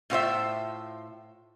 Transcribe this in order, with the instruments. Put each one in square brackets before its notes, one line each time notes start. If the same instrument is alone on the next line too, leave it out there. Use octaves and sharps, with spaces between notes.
[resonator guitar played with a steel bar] A2 F4 C5 E5